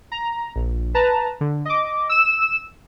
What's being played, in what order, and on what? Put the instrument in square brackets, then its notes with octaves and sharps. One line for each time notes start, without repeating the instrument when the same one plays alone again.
[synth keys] A#5
A#1
B4 A5 A#5
D3
D#5 D6
E6 E7